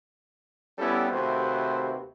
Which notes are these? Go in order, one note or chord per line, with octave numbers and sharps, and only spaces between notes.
G3 B3 C#4 E4 G4 A4
D#2 C3 A3 F#4 B4 C5